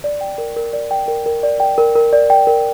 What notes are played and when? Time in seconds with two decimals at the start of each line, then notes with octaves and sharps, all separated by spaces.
0.04 D5
0.21 G5
0.38 A#4
0.56 A#4
0.73 D5
0.91 G5
1.08 A#4
1.26 A#4
1.43 D5
1.60 G5
1.78 A#4
1.95 A#4
2.13 D5
2.30 G5
2.47 A#4